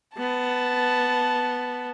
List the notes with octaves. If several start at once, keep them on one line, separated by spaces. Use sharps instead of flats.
B3 A5